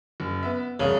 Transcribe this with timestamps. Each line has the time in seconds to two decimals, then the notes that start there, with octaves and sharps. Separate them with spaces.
0.20 F#1
0.43 B3 E5
0.80 E1 C2 C#3